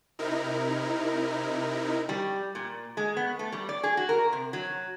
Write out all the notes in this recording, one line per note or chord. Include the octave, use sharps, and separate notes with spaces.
C3 D#4 E4 A#4
G3
A#2
G#3
B3
A3
G3
D5
G#4
F#4
A#4
C3
F#3